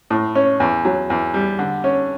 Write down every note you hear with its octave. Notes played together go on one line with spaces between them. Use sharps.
A2
C#4
E2
F#3
E2
G3
D3
C#4